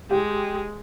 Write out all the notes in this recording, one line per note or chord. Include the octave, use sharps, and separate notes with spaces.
G#3 G4